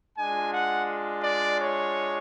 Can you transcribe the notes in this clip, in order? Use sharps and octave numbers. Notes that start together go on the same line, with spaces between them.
G#3 D4 F4 G#5
F#5
D5
C#5